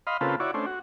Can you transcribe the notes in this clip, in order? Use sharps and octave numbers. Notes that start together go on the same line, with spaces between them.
D#5 F5 B5 C6
C#3 A#3 C4 F4 A4 B4
E4 F#4 C#5 D5
A3 C#4 D4 C5
F#4